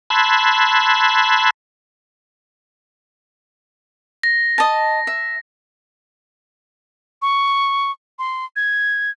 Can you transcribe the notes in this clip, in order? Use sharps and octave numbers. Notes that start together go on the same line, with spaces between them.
A5 B5 C6 E6 F#6 G#6
A#6
D#5 A5
E5
C#6
C6
G#6